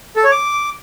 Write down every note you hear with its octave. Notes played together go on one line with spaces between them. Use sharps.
A4
C#5
D6